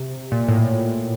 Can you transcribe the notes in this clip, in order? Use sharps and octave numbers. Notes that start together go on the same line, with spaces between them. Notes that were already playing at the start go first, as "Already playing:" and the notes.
Already playing: C3
A#2
A2